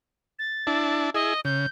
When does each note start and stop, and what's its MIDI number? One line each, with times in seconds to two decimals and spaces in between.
0.39 0.96 93
0.67 1.10 62
0.67 1.10 64
0.67 1.10 81
1.14 1.34 64
1.14 1.34 68
1.14 1.40 75
1.45 1.66 49
1.45 1.69 91